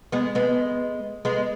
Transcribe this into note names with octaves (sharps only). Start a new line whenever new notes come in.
G#3 B3
G#3 B3
G#3 B3